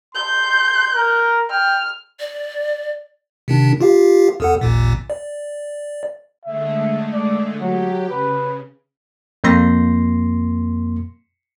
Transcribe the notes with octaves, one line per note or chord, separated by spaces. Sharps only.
C6 G6
A#4
G5 F6
D5
C3 D#3 D4
F4 G4 F5
E2 A4 F#5
A1 D#2 A#2
D5
D3 G#3 A3 E5
D5
F#3 G4
C#3 B4
F2 A#3 C6 A#6